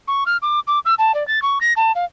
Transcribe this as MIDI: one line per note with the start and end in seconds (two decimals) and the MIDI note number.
0.08 0.24 85
0.26 0.37 89
0.42 0.60 86
0.67 0.79 86
0.85 0.94 88
0.98 1.14 81
1.14 1.26 74
1.27 1.42 93
1.42 1.59 85
1.61 1.73 94
1.76 1.92 81
1.95 2.05 77